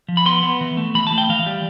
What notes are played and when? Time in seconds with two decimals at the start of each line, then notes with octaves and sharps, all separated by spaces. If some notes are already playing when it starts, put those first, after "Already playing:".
0.08 F3
0.17 B5
0.26 B3 C6
0.43 B3
0.61 E3
0.77 A3
0.95 E3 B5
1.07 A5
1.12 A3
1.18 G5
1.29 E3 F5
1.46 G3